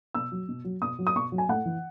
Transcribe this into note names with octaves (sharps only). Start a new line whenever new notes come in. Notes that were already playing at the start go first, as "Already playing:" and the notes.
B2 E6
F#3
B2
F#3
B2 D#6
F#3
D#6
B2 C#6
F#3
G#5
A2 F#5
E3